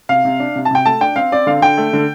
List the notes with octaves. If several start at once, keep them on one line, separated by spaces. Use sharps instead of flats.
C3 F5
C3
D4
C3
A5
C3 G5
A3 A5
D4 G5
C4 F5
C4 D5
D3 F5
D3 G5
A3
D3